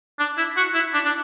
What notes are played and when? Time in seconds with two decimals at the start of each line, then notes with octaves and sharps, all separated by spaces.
0.19 D4
0.37 E4
0.56 F#4
0.74 E4
0.93 D4
1.05 D4